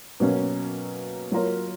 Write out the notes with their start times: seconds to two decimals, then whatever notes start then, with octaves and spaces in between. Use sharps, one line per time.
0.20 B2 F#3 A#3 C#4
1.32 F#3 A#3 F4 A#4 C#5